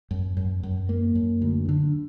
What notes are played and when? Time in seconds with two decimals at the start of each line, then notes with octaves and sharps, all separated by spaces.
0.11 F#2
0.37 F#2
0.63 F#2
0.89 A#3
1.15 F#2
1.42 D2
1.69 D3